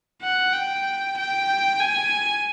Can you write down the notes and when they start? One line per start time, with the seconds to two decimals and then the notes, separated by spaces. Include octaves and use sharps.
0.22 F#5
0.53 G5
1.17 G5
1.80 G#5